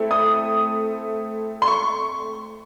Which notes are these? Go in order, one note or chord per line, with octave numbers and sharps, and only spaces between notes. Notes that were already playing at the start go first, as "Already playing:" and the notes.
Already playing: A3 C4 E4
D#6
C6
C#6